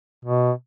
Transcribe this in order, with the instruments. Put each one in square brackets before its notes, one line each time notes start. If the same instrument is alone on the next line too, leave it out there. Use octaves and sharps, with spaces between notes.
[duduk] B2